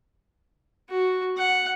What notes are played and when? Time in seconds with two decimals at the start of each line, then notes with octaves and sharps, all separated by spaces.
0.90 F#4
1.37 F#5